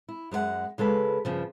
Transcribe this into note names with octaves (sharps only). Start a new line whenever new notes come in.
E4
F#2 G#3 A#4 F#5
C#3 G#3 A4 B4
G2 C#3 F3